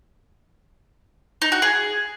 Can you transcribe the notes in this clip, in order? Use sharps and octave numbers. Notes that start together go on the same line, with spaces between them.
D#4
F#4
G#4